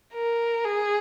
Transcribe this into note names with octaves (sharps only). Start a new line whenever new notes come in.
A#4
G#4